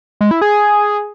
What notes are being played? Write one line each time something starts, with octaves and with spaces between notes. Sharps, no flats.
G#3
E4
G#4